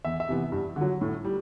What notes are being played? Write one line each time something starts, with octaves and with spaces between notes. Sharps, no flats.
E2 E5
E5
C3 E3 B3
G2
D3
F#3
A2
G3